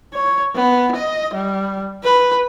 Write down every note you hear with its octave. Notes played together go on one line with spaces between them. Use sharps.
C#5
B3
D#5
G3
B4